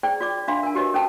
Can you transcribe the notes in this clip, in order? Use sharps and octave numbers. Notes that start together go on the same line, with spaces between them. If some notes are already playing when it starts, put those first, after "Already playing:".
E4 G#4 C5 D5 G5
F4 D5 D6
D4 F4 E5 F5 B5 C6
A#4 G#5
F#4 G4 A#4 B4 C#5 D#5
C#4 A4 C5 G5 A5